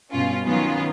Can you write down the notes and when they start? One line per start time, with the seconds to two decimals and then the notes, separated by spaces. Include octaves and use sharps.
0.11 G2 B2 C#4 F4
0.46 D#3 F#3 B3 C#4 F4